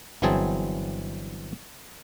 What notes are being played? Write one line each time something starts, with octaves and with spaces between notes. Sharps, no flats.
G1 E3 F#3 C4 G#4 A5